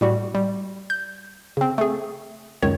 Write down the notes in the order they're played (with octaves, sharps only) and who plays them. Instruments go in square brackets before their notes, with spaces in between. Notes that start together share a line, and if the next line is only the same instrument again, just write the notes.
[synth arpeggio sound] A2 G3 F#4
G3
G6
C#3 C4
A3 G#4
C#2 F#2 D#3 C#5